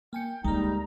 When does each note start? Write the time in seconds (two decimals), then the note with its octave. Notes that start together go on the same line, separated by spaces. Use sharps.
0.13 A#3 G5 G#5 C#7
0.44 D2 G3 G#3 A#3 D#4 A#5